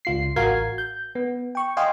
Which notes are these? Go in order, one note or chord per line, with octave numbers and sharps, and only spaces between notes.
C#2 F4 C7
A1 F#4 A#4 F5 G#6 C7
G6
B3
G5 C#6
D#5 F5 G5 G#5 C6